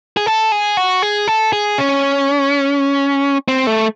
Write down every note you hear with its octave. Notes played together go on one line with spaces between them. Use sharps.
G#4
A4
G#4
F#4
G#4
A4
G#4
C#4
C4
A3